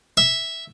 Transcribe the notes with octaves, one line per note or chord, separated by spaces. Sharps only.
E5